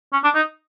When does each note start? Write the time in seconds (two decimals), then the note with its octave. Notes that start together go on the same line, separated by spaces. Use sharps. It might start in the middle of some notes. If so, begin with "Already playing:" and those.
0.13 C#4
0.24 D4
0.35 D#4